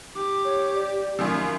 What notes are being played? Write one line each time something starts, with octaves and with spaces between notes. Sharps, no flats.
G4 D6
C#5
D5
F#2 D#3 F3 F5